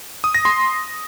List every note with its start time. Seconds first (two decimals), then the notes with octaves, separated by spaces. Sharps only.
0.24 D#6
0.35 A#6
0.45 C6